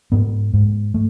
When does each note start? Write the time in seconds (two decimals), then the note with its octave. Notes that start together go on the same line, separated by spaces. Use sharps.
0.12 G#2 B3
0.54 G#2
0.94 A3